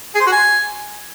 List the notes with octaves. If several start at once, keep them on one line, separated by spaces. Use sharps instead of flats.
G#4
C5
F#4
G#5